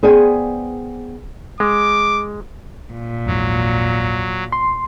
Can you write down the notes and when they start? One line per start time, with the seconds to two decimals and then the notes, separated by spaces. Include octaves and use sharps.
0.03 B3 G#4 C5 D5 G5 G#5
1.60 G#3 D6
2.92 A#2
3.27 A#1 E2 G#2 F#3
4.52 C6